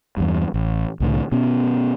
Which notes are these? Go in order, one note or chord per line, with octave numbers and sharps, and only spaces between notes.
E2 G2
A1
C2 A2 D3
B2 B3 C#4